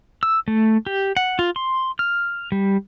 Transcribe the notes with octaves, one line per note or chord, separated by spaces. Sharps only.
E6
A3
G4
F#5
F4
C6
F6
G3